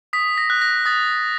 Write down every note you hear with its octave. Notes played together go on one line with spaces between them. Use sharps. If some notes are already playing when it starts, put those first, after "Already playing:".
D#6 B6
A#6
F#6
A#6
D#6 A6